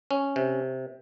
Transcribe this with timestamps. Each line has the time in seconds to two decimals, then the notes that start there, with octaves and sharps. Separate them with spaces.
0.11 C#4
0.36 C3